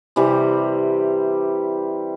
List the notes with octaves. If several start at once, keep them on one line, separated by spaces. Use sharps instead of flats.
C3 E3 G3